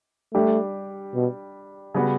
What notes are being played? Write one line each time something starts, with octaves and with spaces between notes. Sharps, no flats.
G3 A3 D4 G4
B2
C#3 G3 B3 F#4